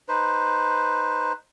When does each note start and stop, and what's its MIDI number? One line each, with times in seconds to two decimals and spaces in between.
0.08 1.33 63
0.08 1.33 71
0.08 1.33 72